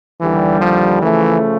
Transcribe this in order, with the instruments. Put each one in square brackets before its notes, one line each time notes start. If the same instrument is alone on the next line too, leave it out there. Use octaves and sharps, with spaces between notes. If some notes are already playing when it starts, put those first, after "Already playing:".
[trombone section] D#2 D3 G3 [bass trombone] E3
[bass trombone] F3
[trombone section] C#3 F3 A3 [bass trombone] E3